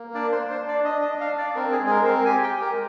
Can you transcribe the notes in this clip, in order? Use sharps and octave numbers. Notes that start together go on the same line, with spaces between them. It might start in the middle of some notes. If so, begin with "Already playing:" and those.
Already playing: A#3
D4 D5
C5
D4
C5
D4
D5
D4 D#5
D#5
D4
F5
D4
D5
C4 A#4
G#4
G#3
G#4
A#4
C4 C5
A#4
G4 G#5
G5
G4
A#4
G#3